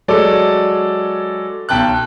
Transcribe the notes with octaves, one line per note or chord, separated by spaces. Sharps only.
F#3 G#3 A4 C#5 D5
B1 G5 A5 F#6